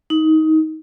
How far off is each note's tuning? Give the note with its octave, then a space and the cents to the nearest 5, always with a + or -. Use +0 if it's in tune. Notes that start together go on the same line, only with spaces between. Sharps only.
D#4 +20